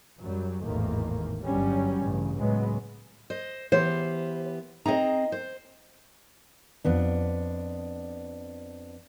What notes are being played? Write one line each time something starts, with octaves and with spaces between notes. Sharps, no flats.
F#2 F#3 G3
G#1 E2 A2 D#3 A3 A#3
G1 F#3 G3 C#4
A1 G2 C#3
C#2 A2 F#3 G#3 B3
C5 D#5
E3 B3 G4 C5
C4 D#4 G#4 D#5 A#5
C5
F2 B3 D4